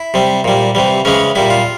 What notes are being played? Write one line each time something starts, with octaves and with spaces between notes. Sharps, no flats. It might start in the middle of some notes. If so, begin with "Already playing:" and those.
Already playing: E4
C3 G3
A#2 G3
C3 E3 G3
C#3 E3 G#3 C#4
A#2 G3 E4
F4